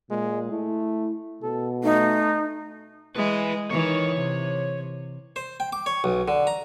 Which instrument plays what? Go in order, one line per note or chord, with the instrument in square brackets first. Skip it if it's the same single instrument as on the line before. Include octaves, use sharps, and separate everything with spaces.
[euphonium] A#2 [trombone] G#3
[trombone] A3 [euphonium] E4
[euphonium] B2 [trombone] A4
[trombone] A3 [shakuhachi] D#4
[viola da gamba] G#3 [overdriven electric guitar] E4 B4
[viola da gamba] D#3 E3 [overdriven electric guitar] C#5
[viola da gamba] C3
[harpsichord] C5
G5
D6
C#5
B1
D3
A#5